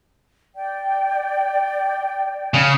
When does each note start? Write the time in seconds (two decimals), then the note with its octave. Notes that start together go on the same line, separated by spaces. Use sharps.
0.54 D5 G5
2.54 C#3